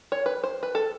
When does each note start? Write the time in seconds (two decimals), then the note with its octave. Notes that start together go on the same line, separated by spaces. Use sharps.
0.12 C#5
0.26 B4
0.44 C5
0.63 B4
0.75 A4